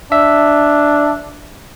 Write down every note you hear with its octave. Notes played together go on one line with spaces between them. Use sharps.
D4 E5